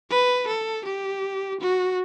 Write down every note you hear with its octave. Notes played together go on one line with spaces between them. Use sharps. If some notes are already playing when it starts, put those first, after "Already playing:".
B4
A4
G4
F#4